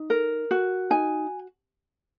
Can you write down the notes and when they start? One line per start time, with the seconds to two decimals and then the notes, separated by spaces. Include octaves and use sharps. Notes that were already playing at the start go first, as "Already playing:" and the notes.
Already playing: D#4
0.10 A#4
0.51 F#4
0.90 D#4 G#5